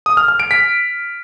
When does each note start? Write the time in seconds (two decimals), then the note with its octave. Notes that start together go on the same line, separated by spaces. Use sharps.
0.06 D#6
0.17 F6
0.28 F6
0.40 D7
0.51 B6